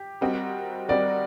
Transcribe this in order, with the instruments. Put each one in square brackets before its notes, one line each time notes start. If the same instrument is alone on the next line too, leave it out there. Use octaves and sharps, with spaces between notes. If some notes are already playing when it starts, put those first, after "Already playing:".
Already playing: [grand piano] G4
[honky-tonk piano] G3 C4 F#4 A#4 D#5
[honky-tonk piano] G3 C4 F#4 A#4 D#5 [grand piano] D5